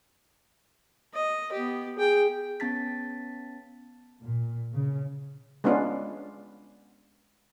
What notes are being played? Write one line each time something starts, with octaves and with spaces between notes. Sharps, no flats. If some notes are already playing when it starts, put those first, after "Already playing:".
D#5
B3 G4
G#4 G5
B3 C#4 A5 A6 B6
A#2
C#3
G#3 B3 C#4 D4 F4